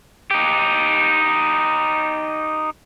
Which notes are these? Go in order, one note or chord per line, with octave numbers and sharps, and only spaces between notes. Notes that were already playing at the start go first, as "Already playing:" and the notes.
D#4 G4